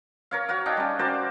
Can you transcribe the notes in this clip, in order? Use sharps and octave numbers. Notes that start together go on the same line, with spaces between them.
A#4 C#5 F5
F#4 C#5 F5
D4 D#4 F5 G5
G3 C#4
F#4 A#4 C5 D5